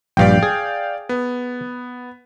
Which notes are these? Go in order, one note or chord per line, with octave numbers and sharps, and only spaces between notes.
A#1 G2 D5 F5 G5
G#4
B3